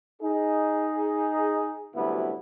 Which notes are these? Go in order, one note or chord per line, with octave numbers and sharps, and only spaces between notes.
D#4 G#4
D2 C3 F#3 G3 B3 E4